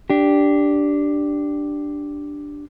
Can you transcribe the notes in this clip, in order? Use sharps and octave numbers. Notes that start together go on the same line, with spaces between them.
D4 G4